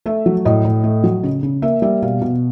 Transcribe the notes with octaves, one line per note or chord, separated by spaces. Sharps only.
A3 E5
F#3
A2 D#5
A2
A3
F#3
C#3
C#3
A#3 E5
G3 E5
B2 F5
B2